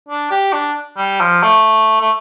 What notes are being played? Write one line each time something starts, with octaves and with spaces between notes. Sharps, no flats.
D4
G4
D4
G3
F3
A3
A3